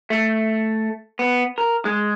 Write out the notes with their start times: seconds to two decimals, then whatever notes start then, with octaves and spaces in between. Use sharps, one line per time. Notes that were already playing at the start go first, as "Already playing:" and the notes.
0.10 A3
1.19 B3
1.58 A#4
1.85 G#3